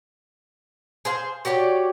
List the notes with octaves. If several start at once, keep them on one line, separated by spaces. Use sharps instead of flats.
G#4 C5 F5
F#4 G4 C#5 D5